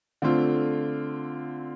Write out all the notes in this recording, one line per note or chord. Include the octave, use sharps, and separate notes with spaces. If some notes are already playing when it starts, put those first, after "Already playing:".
D3 A3 C4 F4